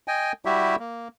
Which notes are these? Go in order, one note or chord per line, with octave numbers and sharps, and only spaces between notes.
D#5 G5 G#5
G3 E4 F#4 G4 E5
A#3